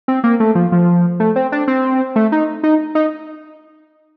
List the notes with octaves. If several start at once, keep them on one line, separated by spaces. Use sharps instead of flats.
C4
A#3
A3
F3
F3
A3
C4
D4
C4
A3
D#4
D#4
D#4